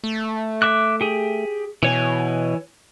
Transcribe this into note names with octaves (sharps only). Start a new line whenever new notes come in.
A3
E5 D6 F#6
G4 G#4
B2 E3 C#5 G#5